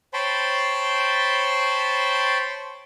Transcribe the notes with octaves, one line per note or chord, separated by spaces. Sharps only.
C5 C#5 G5 A5 B5 C6